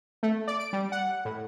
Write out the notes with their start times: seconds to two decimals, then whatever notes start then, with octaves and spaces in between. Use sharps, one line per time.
0.23 A3
0.48 D5
0.60 D7
0.73 G3
0.92 F#5
1.25 A2